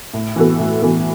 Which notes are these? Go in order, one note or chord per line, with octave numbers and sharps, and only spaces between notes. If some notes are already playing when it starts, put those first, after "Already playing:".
A2
E3 B3 F#4 A4
A2
E3 B3 F#4 A4